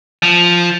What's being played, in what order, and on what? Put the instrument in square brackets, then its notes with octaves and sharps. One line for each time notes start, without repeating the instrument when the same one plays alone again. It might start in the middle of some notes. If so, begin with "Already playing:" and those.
[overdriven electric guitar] F3